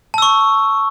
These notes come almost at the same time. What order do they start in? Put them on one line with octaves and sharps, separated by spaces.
A5 E6 C#6